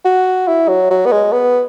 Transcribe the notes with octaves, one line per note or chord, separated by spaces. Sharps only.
F#4
E4
F#3
F#3
B3
G#3
B3